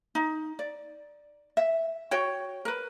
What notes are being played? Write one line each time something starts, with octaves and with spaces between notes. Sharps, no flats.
D#4
D5
E5
F#4 C#5 G5
A#4 B4